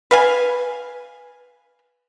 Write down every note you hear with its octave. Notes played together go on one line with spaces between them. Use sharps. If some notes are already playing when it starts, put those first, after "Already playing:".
B4 F5 G#5